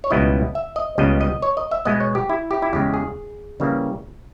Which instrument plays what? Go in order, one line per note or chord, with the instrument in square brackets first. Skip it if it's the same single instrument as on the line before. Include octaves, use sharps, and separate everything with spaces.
[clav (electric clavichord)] C#5
C#2 B2 G3 B3 E4 D#5
E5
D#5
C#2 C#3 G3 B3 D#5
D#5
C#5
D#5
E5
B2 G#3 B3 D#5
C#5
G4
E4
G4
E4
E2 C#3 G#3 G4
G#4
C#3 E3 G3 A#3